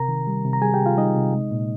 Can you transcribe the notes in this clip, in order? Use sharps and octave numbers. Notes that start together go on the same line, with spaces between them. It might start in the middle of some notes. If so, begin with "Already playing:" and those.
Already playing: C3 A#4 A#5
D#3
G3
C3
A#5
G3 G#4 G#5
G4 G5
C3
F4 F5
G3 D#4 D#5
C3
G#3
A#2